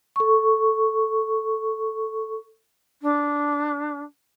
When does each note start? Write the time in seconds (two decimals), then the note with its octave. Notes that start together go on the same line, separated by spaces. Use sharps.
0.16 A4 C#6
3.02 D4